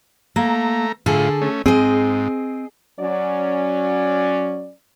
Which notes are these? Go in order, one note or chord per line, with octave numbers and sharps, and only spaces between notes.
A3 A#3 A#5
A2 D3 F4 G#4 A4
A3 C#4
G#2 C4 G#4 D#5
F#3 C#4 D5